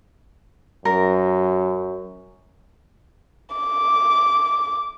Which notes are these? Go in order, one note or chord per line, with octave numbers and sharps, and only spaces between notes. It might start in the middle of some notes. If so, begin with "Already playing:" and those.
F#2 A#4
D6